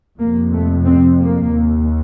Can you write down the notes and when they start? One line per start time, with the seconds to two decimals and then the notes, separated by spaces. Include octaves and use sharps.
0.19 F2 C3 A#3
0.53 A3
0.85 C4
1.19 A#3
1.53 D#2